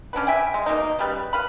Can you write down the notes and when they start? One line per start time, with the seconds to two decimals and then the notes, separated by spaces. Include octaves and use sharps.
0.13 C#4 D4 F#4 B4
0.27 E5 G5 G#5
0.54 G#3
0.66 B2 A#3 D#4
0.99 C#3 G3 B4
1.33 B4 F5 B5